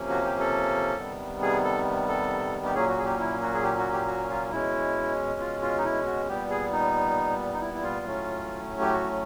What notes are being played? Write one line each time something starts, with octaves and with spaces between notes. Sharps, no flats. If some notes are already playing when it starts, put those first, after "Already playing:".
Already playing: C3 F3 A#3 C#4
F#4
G4
A4
C3 D#3 G3 B3
G#4
A4
A4
G4
A#2 F#3 A#3 C#4 G#4
F#4
G#4
G4
E4
F#4
G#4
G4
F#4
G4
F#4
F4
B2 G#3 C#4 E4
F4
F4
D#4
E4
F#4
A#2 G3 B3 G4
G#4
D#4
D#4
E4
E4
F4
A2 F#3 A3 C#4
G4
F#4